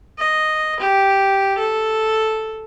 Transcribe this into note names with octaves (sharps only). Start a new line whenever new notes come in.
D#5
G4
A4